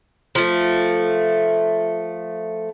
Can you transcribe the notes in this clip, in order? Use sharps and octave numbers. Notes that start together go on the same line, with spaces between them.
F3 A3